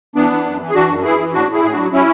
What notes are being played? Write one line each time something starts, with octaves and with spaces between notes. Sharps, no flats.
E3 B3 D4
E3
F#2
E3
G#4
E3 D4 F#4
F#2
E3 E4 G#4
E3
A2 D4 F#4
A2 E4 G#4
A2 G#4
F#3 D4 F#4
F#3 C#4 E4